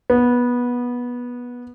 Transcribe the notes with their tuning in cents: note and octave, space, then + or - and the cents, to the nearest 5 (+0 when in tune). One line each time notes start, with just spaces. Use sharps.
B3 -15